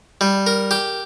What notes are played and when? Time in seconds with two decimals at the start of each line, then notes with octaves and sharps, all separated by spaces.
0.21 G3
0.47 A#4
0.71 G4